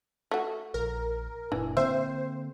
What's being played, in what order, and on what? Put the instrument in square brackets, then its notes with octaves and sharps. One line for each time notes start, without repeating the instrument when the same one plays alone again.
[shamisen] A3 F#4
[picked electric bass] A#1 [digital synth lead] A#4
[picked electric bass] F#1 A#2 D4 [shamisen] E3
[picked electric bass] D3 A#3 C4 [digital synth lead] C5 [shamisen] E5